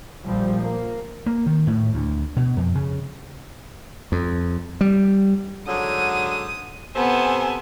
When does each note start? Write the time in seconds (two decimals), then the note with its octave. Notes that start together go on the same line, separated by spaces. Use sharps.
0.24 A#1 A#2 F3 G3
0.61 A#3
1.26 A#3
1.46 D#3
1.67 A2
1.94 D2
2.36 B2
2.57 F2
2.75 C#3
4.12 F2
4.81 G3
5.68 G#2 D3 F#3 D#6
6.96 C3 B3 A4 C5 G#5